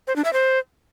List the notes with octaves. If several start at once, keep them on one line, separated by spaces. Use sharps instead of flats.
C5
D4
E5
C5